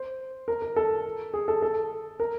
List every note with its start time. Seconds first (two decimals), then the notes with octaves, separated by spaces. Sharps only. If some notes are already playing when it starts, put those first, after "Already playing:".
Already playing: C5
0.48 A#4
0.62 A#4
0.76 A4
1.34 G#4
1.48 A4
1.62 A4
2.20 A#4